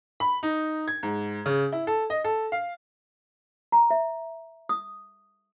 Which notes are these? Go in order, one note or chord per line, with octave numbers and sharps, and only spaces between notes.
B5
D#4
G#6
G#2
C#3
E4
A4
D#5
A4
F5
A#5
E5
D#6